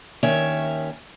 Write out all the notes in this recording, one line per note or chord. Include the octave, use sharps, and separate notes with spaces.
D#2 D#3 C#4 C#5 E5 G5